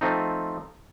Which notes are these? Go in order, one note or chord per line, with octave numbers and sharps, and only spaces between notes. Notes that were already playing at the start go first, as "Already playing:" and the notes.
F3 A3 C4 D#4